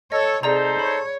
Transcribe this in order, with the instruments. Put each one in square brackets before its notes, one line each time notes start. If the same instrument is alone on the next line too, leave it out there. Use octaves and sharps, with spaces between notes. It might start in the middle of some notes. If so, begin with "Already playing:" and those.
[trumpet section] A4 [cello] C#5 [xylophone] D#5
[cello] C3 [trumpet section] D#4 A4 C5 [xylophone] G#4 D5 A#5
[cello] C#5 [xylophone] B5